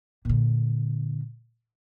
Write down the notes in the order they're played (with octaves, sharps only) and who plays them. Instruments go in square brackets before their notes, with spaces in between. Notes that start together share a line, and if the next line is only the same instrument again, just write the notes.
[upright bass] A#2 D3